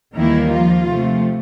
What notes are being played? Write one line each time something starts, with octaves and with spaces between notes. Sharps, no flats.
D#2 D#3 E3 G3 A#3 E4
F3 F4
C3 F3 A3